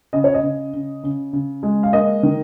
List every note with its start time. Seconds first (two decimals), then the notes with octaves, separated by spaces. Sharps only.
0.13 C#3 D#5
0.24 C#5
0.34 D#5
0.43 C#3
0.73 C#3
1.03 C#3
1.33 C#3
1.63 G#3
1.83 F5
1.92 A#3 D#5
2.23 D#3